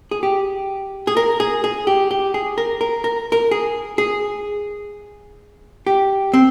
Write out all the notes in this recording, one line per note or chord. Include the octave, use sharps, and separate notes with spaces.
G#4
G4
G#4
A#4
G#4
G#4
G4
G4
G#4
A#4
A#4
A#4
A#4
G#4
G#4
G4
C4